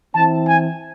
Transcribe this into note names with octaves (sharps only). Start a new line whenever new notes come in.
E3 C4 E4 A5
G#5